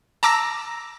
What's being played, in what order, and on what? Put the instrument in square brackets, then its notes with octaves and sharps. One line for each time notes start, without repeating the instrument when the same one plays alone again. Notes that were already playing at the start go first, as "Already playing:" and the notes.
[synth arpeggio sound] A5 A#5 D6 E6 A#6